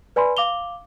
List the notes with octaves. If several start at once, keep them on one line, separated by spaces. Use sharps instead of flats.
B4 D5 G#5 B5 C6
F5 D6 F7 G7